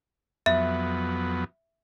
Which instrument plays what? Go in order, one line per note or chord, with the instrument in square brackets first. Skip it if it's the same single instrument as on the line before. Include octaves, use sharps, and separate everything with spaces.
[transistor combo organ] F2 F#3 B3 [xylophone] E5